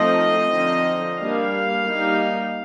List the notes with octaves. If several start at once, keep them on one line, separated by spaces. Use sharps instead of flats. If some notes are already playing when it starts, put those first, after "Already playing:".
Already playing: F3 A3 C4 D#4 D#5
D3 F3 C4 D#4
G3 A#3 D4 F5
G3 A#3 D#4